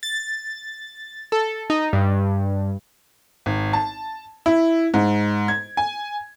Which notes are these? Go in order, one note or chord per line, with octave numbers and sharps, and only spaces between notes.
A6
A4
D#4
G2
G#1
A5
E4
G#2
G#6
G#5